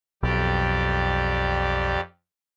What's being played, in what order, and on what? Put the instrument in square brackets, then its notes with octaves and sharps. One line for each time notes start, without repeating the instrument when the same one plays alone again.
[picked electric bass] B1 [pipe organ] F2 G4 D5